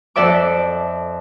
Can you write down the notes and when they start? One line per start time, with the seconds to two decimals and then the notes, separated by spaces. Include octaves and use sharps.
0.16 F2 A4 D5 E5 D6